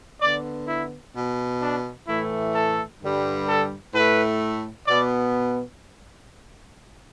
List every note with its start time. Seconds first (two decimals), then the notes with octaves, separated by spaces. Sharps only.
0.21 D3 B3 D5
0.67 E4
1.15 B2 B3
1.61 D4
2.07 A2 E3 A3 E4
2.54 A4
3.00 G2 D3 G3
3.47 A4
3.93 A2 A3 B4
4.87 B2 B3 D5